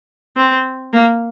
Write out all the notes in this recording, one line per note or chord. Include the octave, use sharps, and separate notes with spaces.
C4
A#3